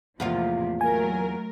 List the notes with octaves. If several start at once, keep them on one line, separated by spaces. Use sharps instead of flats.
E2 A2 C3 F3 A#3 F4
F#3 A3 A#4 G#5